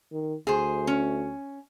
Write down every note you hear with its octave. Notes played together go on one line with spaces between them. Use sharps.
D#3
D2 G#4 C5
C#4